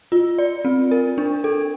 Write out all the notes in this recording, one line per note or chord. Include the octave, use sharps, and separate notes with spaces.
F4
D5
C4
A#4
D4
A4